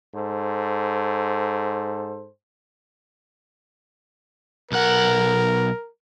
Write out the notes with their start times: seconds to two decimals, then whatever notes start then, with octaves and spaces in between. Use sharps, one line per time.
0.15 G#2 A4 C5
4.72 B1 A#4 F#5